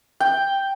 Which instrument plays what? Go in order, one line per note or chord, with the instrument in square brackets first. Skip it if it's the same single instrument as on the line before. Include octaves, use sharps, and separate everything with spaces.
[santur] G5